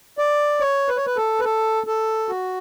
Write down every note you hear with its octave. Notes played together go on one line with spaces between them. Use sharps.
D5
C#5
B4
C#5
B4
A4
B4
A4
A4
F#4